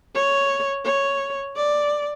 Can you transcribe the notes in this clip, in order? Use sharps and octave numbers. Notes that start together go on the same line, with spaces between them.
C#5
C#5
D5